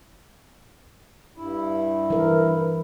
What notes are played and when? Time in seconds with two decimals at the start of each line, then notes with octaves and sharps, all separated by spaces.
1.37 G2 E4
2.10 E3 A#4